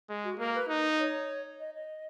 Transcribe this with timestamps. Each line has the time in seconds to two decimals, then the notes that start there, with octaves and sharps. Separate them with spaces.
0.09 G#3
0.24 F#4
0.39 A#3 A#4
0.55 B4
0.69 D#4
0.99 C#5
1.60 D#5
1.75 D#5